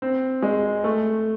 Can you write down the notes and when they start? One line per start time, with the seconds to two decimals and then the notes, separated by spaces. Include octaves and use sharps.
0.02 C4
0.42 G#3
0.84 A3